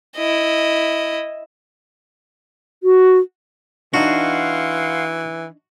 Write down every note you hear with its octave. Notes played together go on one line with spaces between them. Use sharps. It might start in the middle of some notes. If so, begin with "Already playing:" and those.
E4 D#5
F#4
E3 D4 D#4 F#4 F5 F#5 C6